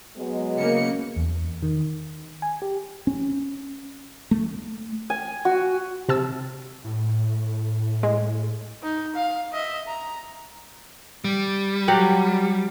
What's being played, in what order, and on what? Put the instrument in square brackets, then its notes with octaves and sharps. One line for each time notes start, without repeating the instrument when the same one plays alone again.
[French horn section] F#3 G#3 B3
[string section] C#3 A#3 C#7
[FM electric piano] E2
D#3
G#5
G4
[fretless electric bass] C#4
A3
[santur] G#5
F#4
[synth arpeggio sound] C3 A5 E6
[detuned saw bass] A2
[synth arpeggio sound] G#3
[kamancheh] D#4
F5
D#5 E5
A#5
[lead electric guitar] G3
[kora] F#3 G4 F#5